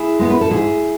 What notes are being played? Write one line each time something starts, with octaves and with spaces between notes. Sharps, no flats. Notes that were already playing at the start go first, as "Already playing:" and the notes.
Already playing: E4 G#4
G#3 B3
B4
A4
G#2 E4 G#4